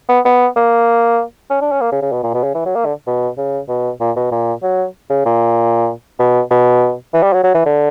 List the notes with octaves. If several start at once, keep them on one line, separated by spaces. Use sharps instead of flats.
B3
B3
A#3
C#4
D4
C#4
A#3
C#3
C#3
B2
A#2
B2
C#3
E3
F#3
A#3
D3
B2
C#3
B2
A#2
B2
A#2
F#3
C#3
A#2
B2
B2
E3
G3
F#3
F#3
E3
D3